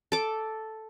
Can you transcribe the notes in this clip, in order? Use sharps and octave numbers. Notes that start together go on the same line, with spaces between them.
A4 D6